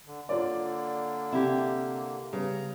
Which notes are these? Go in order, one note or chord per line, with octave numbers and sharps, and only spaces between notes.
D3
D3 A#3 F4 C#5 D5
C3 E4 G4
C#3 G3 B3 A#5